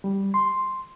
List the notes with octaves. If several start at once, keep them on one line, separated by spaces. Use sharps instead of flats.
G3
C6